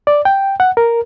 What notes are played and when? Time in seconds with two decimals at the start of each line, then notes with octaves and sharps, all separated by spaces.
0.07 D5
0.25 G5
0.60 F#5
0.77 A#4